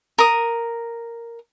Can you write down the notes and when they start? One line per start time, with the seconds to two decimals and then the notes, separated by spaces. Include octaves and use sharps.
0.18 A#4 D#6